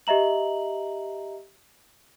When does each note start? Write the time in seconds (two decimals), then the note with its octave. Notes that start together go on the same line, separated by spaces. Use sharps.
0.07 G4 D#5 E5 A#5 F#7